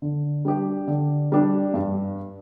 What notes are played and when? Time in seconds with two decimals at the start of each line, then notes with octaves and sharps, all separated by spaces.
0.02 D3
0.45 G3 D4 G4
0.88 D3
1.32 G3 D4 G4
1.74 G2